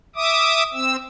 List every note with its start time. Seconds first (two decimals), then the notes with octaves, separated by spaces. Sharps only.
0.16 E5 D6 D#6
0.74 C4 E6